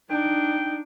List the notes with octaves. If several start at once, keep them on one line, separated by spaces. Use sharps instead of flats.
D4 D#4 G5